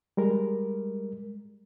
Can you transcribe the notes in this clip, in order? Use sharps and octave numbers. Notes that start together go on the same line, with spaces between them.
G3 G#3 A#4